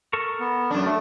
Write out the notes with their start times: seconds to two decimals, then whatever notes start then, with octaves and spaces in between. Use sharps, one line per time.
0.13 A4 A#4 C#6
0.40 B3
0.71 F#2 D4
0.85 A3